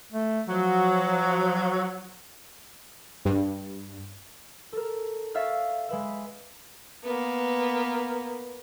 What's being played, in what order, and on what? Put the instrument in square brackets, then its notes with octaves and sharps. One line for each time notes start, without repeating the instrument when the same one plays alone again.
[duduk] A3
[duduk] F3 [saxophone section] F#3
[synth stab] G2
[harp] A4 A#4
C#5 E5 F5 F6 A6
G#3 B4 E5
[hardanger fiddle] A#3 B3